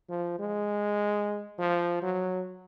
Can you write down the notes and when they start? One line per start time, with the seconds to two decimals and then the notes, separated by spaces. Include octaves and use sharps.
0.09 F3
0.39 G#3
1.58 F3
2.02 F#3